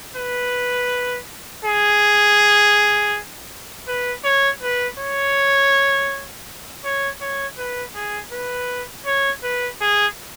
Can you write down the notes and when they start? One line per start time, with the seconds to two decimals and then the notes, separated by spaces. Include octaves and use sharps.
0.16 B4
1.65 G#4
3.88 B4
4.24 C#5
4.62 B4
4.99 C#5
6.84 C#5
7.21 C#5
7.58 B4
7.95 G#4
8.32 B4
9.06 C#5
9.43 B4
9.81 G#4